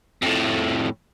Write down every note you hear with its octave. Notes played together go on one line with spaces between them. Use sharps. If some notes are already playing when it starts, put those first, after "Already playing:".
F2 A2